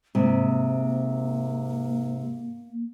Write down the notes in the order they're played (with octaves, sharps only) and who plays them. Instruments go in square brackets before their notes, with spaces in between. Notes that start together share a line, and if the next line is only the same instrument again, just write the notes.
[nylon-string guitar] G#2 C3 [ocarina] A#3